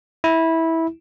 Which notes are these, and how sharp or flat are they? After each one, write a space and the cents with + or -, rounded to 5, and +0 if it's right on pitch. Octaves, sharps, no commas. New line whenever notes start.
E4 -15